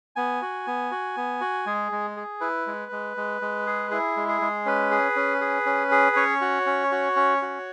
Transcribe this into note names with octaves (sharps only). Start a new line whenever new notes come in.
B3 G#5
F#4
B3
F#4
B3
F#4
G#3 G#4
G#3
G#4
E4 B4
G#3
G#3
G#3
G#3
G#4
E4 G#4
G#3
G#4
G#3
C#4 B4
G#4
C#4
G#4
C#4
G#4
C#4 C#5
F#4
C#4
F#4
C#4
F#4